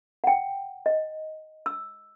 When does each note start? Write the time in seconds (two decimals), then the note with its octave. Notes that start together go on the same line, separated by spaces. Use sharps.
0.24 F#5 G5
0.86 D#5
1.66 E6